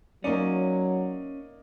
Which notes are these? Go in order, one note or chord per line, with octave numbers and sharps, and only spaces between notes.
F#3 A#3 C#4 D#4 D5